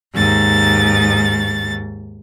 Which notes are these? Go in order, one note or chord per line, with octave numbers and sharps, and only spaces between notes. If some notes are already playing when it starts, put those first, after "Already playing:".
D#2 G#2 A6